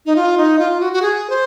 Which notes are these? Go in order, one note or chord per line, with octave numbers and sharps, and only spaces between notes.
D#4
F4
D#4
F4
F#4
F#4
G#4
C5